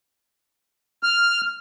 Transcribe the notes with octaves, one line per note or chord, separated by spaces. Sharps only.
F6